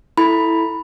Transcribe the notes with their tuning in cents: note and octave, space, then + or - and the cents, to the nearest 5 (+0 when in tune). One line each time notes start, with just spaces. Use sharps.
E4 +0 A4 +0 B5 +0